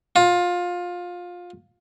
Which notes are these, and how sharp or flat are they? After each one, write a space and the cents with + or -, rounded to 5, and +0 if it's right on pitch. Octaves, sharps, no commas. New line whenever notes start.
F4 +20